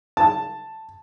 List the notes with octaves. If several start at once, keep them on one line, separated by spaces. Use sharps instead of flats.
A5